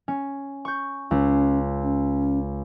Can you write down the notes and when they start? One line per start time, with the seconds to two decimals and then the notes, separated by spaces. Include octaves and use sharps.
0.08 C#4
0.65 C#6 G6
1.11 C#2 C#4
1.82 C#4